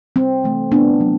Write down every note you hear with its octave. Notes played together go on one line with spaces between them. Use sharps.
C3 G3 C4
C3 E3 A3
C3 G3 B3 D4
C3 F#3 A3